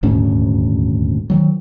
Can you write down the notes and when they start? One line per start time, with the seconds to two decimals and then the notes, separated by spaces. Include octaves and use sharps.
0.03 D#1 D2 G#2 C#4
1.30 D#3 F#3